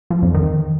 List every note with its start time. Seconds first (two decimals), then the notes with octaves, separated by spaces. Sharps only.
0.10 F3
0.22 F2
0.34 D#3